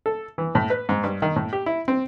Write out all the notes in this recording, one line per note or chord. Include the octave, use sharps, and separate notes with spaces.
A4
E3
A2
B4
G#2
G2
D#3
A2
G4
E4
C4